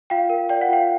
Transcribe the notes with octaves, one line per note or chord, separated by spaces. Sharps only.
F4 F5 G5
A#4
D5 G5
F#5
F4 F5 G5